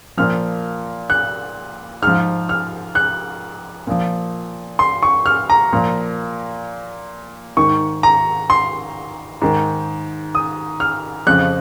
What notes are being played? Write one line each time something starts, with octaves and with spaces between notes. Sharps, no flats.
A#2 F3 F6
F#6
G#2 F3 F6
F6
F#6
A#2 F3
C6
C#6
F6
A#5
A#2 F3
G#2 D#3 C#6
A#5
C6
G#2 D#3
D#6
F6
F2 C#3 F3 F#6